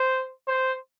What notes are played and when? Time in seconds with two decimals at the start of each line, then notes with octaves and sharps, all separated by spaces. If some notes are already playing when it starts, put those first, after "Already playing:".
Already playing: C5
0.48 C5